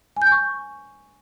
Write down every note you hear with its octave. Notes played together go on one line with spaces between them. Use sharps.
G#5
G6
G#5
C#6